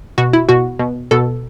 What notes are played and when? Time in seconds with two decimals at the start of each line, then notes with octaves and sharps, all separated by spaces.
0.18 B2 F#4
0.33 E4
0.49 B2 F#4
0.79 B2
1.11 B2 A4